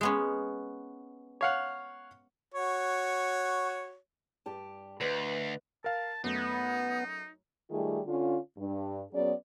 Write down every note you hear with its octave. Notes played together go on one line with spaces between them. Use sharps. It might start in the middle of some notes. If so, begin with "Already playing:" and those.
G#3 B3 C#4
C#5 F5 F#5
F#4 C#5
G2 G4 A5
D2 B4 D#5
A#4 F5 A5
F#2 A3 B3 D#4
D#3 G3 A3 F4 G#4
D3 C#4 F4
G2
F#3 B3 C#4 G#4 D5